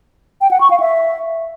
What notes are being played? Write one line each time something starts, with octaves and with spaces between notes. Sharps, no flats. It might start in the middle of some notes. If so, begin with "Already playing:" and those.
G5
F#5
C#6
F5
E5